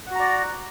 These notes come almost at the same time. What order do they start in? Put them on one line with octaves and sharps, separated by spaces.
F#5 F#4 A#5 D5